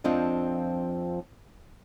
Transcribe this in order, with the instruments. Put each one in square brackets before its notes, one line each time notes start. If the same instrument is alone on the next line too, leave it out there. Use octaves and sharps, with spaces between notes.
[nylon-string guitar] F2 F3 C4 D4 D#5